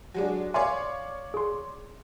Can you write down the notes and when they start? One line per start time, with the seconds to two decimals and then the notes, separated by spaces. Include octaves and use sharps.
0.14 F#3 G#3 D4
0.54 C#5 D5 E5 F5 G#5 C6
1.34 G#4 C6